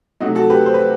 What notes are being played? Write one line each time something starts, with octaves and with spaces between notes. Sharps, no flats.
C3 F#3 A3 D#4 F#4
F#4 A4
G4 B4
C5
B4